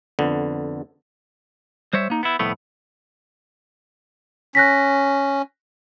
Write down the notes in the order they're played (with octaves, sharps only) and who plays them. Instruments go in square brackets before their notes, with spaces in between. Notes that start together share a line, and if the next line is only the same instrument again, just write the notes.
[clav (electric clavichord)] F2 D3 B3
[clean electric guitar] G3 C5 C#5 E5
A#3 D#4
B3 E4
C2 F2 A2 A3 B3
[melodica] C#4 [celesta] F#6 A#6 B6